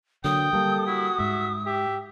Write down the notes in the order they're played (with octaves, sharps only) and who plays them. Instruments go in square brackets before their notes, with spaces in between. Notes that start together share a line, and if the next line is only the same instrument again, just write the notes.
[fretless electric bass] D3 F#3 A#3 [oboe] G5 [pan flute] D#6
[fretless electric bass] G3 A#3 [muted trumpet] A4
[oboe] E4 [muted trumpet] F#4
[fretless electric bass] G#2 G#3 [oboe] E5
[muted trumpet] G4 [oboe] E5